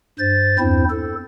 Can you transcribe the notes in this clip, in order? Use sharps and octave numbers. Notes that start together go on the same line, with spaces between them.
G2 C5 A6
E2 G2 C4 E4 C5
A4